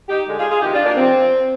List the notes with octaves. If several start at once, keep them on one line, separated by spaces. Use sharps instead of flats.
D#4 G4
D3 G#3
F4 G#4
F4 G#4
C3 D#3 G#3 D#4 G4
D4 F4
A#3 D4
C3 F3 C4